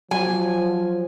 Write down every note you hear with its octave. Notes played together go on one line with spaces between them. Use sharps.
F3 F#3 G#5